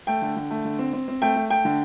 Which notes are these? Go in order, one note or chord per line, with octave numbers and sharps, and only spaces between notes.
A3 G5
D3
D3
A3
D3
C4
C4
C4
A3 G5
A3
A3 G5
D3